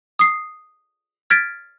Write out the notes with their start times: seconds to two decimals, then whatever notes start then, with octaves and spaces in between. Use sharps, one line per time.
0.19 D#6 C7
1.30 F6 G#6 A6 B6 D7